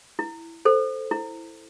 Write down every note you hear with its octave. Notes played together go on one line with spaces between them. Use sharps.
E4
A4 C5
E4